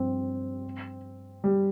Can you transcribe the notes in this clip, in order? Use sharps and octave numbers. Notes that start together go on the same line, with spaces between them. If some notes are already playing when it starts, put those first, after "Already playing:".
Already playing: G2 F3 C4
G3